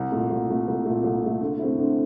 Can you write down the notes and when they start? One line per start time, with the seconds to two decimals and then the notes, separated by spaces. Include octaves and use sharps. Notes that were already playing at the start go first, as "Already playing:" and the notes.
Already playing: C2
0.12 A#2 A3
0.30 C2
0.49 A#2 A3
0.67 C2
0.85 A#2 A3
1.04 C2
1.23 A#2 A3
1.41 D3
1.59 A3 C4 E4
1.78 D3